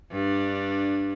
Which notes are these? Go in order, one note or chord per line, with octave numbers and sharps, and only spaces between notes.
G2 D4